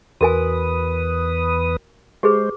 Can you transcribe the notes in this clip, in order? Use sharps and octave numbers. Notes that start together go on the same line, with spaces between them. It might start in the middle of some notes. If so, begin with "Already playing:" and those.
E2 F#4 A#4 B4 G#5 D#6
G#3 G4 G#4 B4 C5